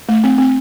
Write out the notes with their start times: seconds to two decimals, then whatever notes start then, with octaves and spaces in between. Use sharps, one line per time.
0.09 A3
0.24 C4
0.38 C4